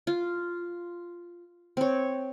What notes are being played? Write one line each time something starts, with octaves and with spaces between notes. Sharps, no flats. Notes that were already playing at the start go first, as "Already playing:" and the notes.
F4
C4 C#5